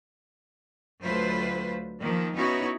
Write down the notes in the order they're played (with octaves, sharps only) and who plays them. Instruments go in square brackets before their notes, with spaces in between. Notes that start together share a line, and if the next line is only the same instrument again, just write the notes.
[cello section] D2 F#3 A3 F4 B4 C5
D#3 F3 A#3
B3 C#4 D#4 E4 F#4 C#5